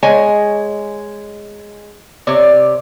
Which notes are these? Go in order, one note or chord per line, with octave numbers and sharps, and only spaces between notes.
G#3 C#5 D#5 G#5
C3 C#5 D5